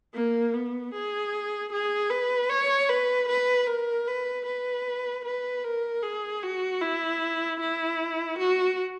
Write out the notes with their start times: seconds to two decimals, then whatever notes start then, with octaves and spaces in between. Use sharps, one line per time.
0.14 A#3
0.54 B3
0.94 G#4
1.72 G#4
2.10 B4
2.50 C#5
2.89 B4
3.28 B4
3.67 A#4
4.07 B4
4.46 B4
5.25 B4
5.64 A#4
6.03 G#4
6.43 F#4
6.81 E4
7.60 E4
8.38 F#4